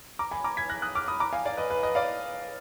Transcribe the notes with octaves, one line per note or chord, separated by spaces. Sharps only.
A#5 D6
G#5 B5
A#5 D6
G#6 B6
F#6 A#6
D#6 F#6
D6 F6
B5 D#6
A#5 D6
F5 G#5
D5 F5
B4 D#5
B4
B4 D#5
D5 F5